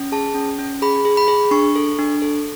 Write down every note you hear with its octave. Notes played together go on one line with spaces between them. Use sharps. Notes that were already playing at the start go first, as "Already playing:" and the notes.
Already playing: C#4
G#4 A5
C#4
C#4
G#4 B5
G#4
B5
G#4
D4 C#6
A4
D4
A4